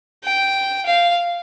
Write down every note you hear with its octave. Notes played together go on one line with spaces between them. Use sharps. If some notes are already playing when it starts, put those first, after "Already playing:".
G5
F5